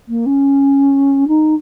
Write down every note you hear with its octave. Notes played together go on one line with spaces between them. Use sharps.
A#3
C#4
D#4